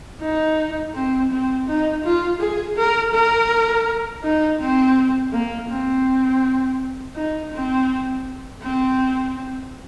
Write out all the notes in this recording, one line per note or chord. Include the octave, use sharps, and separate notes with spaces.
D#4
C4
C4
D#4
F4
G#4
A#4
A#4
D#4
C4
A#3
C4
D#4
C4
C4